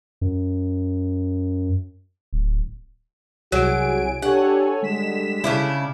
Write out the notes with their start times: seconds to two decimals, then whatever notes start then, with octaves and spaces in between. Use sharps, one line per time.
0.21 F#2
2.33 D1
3.52 C2 F#3 F#4 G#4 G#5 D7
4.22 D4 G4 A4 C#5 F#5 G#5
4.82 D3 G3 G#3 B6 E7
5.44 C#3 D4 E4